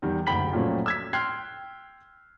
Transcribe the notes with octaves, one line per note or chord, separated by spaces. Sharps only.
E2 D#3 G3
F#1 D2 G5 B5 B6 F#7
A#2 F3 F#3 A3 C#4
E6 G#6 B6
G5 C6 F6 F#6 G#6 C7